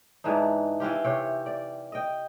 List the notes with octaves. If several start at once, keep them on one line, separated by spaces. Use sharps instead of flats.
G#2 E3 D4 D#4
E3 C4 F4 G4
C3 C#5 G5
D5
D#5 G5